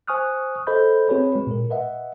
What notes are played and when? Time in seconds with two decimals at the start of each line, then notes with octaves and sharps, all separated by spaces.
0.07 C5 G#5 C#6 D#6 F6 F#6
0.67 A4 C5 D#5 B5 G6
1.09 C4 F#4 G#4 B4 C#5 B5
1.36 G#3
1.47 A#2 A#4
1.70 B4 D#5 E5 F#5